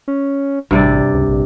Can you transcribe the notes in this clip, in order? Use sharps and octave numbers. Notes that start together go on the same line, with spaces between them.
C#4
A1 G2 C3 D5
C#2
A#1